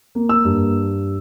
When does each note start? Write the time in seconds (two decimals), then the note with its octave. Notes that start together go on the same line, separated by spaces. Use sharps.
0.15 A#3
0.29 E6
0.45 G2